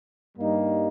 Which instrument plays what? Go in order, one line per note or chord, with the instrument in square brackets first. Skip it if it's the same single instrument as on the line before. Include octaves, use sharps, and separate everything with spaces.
[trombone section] G2 G3 A#3 D#4